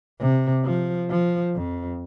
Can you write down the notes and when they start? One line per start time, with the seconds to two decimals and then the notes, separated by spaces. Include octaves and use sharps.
0.20 C3
0.64 F3
1.10 F3
1.55 F2